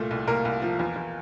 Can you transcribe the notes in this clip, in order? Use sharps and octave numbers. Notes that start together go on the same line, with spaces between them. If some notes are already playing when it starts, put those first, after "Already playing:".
Already playing: C2 A#2 A3 A4
C2
C2 A#3 A#4
C2
F3
E2
E2